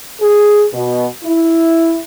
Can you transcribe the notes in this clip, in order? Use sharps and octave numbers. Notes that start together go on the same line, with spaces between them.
G#4
B2
E4